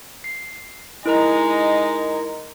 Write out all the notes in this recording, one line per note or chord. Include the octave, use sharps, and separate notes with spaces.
C7
G#3 D#4 E4 A#4 A#5